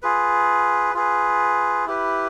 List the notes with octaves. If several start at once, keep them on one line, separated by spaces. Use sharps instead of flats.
F4 G#4 B4
F4 G#4 B4
E4 G4 B4